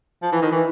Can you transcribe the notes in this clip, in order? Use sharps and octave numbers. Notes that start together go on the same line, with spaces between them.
F3
E3
D#3
E3